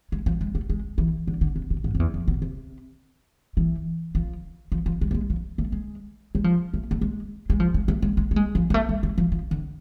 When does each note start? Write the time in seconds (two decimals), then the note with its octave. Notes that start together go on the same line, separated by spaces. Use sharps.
0.12 G#3
0.26 F3
0.41 G#3
0.55 A3
0.70 G#3
0.98 E3
1.27 D3
1.41 D3
1.56 C3
1.70 B2
1.84 G#2
1.95 F2
2.00 E2
2.14 F2
2.28 B2
2.42 C3
3.57 E3
4.15 F3
4.72 F3
4.86 F3
5.01 G#3
5.11 A3
5.15 G#3
5.30 F3
5.58 A3
5.72 G#3
6.35 G#3
6.44 F3
6.74 A3
6.91 A3
7.01 G#3
7.50 G#3
7.60 F3
7.74 G#3
7.88 A3
8.02 G#3
8.17 G#3
8.31 A3
8.36 G#3
8.55 F3
8.70 G#3
8.74 A3
8.89 G#3
9.03 G#3
9.18 F3
9.32 F3
9.51 D3